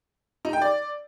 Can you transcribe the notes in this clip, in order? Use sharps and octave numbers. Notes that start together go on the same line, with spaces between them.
D#4
G5
D5